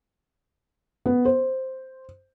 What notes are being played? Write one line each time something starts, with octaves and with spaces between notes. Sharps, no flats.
B3
C5